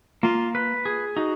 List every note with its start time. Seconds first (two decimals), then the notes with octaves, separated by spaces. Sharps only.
0.23 A#3 F4
0.55 B4
0.85 G#4
1.17 D#4 F#4